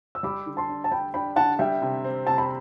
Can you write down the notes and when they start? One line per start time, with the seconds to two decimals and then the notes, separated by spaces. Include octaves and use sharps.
0.15 E6
0.23 G3 B5 D6
0.46 D3
0.57 A5 C6
0.69 D4
0.84 A5
0.91 D4 G5 B5
1.14 D4 G5 B5
1.36 D3 F#5 A5
1.59 G3 E5 G5
1.82 C3
2.04 C4
2.27 C3 A5
2.38 B5